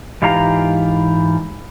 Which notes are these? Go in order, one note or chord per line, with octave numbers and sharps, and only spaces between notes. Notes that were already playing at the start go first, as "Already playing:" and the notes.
G#2 E3 F4 G4 F5 A#5